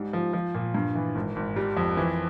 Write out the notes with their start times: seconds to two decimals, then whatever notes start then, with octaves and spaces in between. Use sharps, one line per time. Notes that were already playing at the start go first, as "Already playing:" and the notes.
Already playing: G#2 G3
0.13 F3
0.33 F3
0.54 A#2
0.74 G2
0.95 E3
1.15 G#1
1.36 G#1
1.56 G3
1.77 F2
1.97 E3